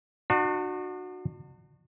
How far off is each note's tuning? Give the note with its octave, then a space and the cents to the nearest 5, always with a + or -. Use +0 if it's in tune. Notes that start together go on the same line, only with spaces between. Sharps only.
D4 +40 F#4 -15